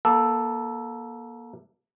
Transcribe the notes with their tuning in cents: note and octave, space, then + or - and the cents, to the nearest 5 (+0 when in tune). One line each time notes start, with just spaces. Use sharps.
A#3 +30 A4 +0